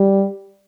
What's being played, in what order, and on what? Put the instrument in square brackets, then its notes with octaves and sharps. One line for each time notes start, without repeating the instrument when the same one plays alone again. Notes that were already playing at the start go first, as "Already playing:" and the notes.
Already playing: [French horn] G3